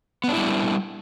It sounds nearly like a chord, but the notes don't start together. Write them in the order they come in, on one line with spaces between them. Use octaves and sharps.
B3 D4 E4 G3